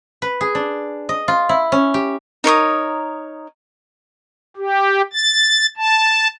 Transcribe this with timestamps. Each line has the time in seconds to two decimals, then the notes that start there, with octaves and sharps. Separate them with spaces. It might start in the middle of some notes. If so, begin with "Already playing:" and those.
0.22 B4
0.41 G#4
0.55 D4
1.09 D#5
1.28 F4
1.49 E4
1.72 C#4
1.94 G4
2.44 D#4 A#4 C#5 D#6
4.57 G4
5.13 A6
5.77 A5